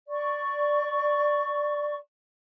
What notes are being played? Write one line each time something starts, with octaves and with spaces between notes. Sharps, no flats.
D5 C#6